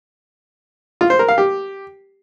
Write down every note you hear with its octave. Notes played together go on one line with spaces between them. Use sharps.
F4
C5
A#4
F5
G4